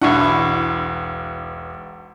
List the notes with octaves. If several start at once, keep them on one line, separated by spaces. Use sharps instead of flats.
E1 B1 D4 E4 F#5 C#6